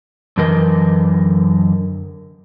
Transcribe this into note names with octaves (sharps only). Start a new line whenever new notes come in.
F#2 D3 E3 A#4 D#5